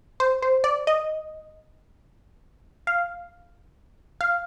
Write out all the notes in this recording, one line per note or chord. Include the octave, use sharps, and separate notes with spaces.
C5
C5
D5
D#5
F5
F5